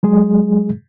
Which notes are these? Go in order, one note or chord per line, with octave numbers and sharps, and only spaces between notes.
F#3 G#3 G#4